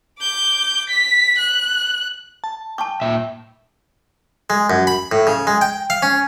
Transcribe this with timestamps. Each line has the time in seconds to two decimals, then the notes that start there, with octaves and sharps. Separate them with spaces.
0.19 D6 G6
0.90 B6
1.38 F#6
2.44 A5
2.78 G5 A5 C#6 D6
3.02 A#2 E5
4.50 G#3
4.70 F#2
4.87 B5
5.12 A2
5.27 C#3
5.47 G#3
5.61 G5
5.90 F5
6.03 C#4